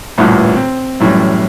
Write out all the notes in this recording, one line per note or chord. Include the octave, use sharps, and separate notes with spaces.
A1 D2 G2 A#2 E3
C4
F#2 A2 E3 G3